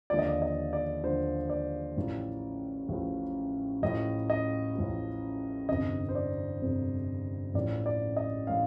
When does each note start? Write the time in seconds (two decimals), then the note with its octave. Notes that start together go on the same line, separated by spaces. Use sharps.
0.10 D#2 D3 F3 D5
0.19 D#5
0.28 D5
0.42 D#5
0.73 D5
1.03 D#2 D3 F3 C5
1.50 D5
1.96 A1 A2 F3
2.89 A1 A2 F3
3.83 A1 A2 F3 D#5
4.30 D#5
4.75 A1 A2 F3
5.69 G1 F2 C3 D#5
6.09 C5
6.15 D5
6.62 G1 F2 C3
7.54 A1 A2 F3 D5
7.86 D5
8.17 D#5
8.47 A2 F5